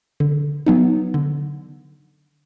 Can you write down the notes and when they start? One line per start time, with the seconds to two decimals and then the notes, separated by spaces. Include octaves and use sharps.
0.20 D3
0.66 F#3 B3 D#4
1.14 D3